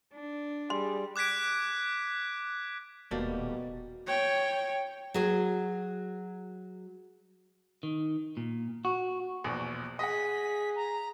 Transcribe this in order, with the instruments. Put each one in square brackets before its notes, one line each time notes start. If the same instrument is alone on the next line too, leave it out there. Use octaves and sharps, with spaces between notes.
[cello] D4
[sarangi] G3 [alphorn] G#4 [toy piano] C6
[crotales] D6 F#6 G#6 B6 D7
[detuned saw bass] D#1 [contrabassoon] B2 [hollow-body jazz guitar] G3 A3 A#3
[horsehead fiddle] C#5 G5
[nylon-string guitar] F#3 F#4 G#4 C#5
[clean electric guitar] D#3
A#2
F#4
[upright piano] A#1 E2 B2
[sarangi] G#4 [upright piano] D#5 F#5 [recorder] B6
[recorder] A#5